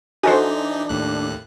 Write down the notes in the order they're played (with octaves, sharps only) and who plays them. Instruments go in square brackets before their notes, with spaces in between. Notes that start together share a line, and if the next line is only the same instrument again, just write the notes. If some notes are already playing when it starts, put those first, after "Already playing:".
[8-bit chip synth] E3 D#4 [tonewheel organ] D4 [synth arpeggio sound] F#4 A4 C5 [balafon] D#5 G#5
[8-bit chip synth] D#2 A2 F#6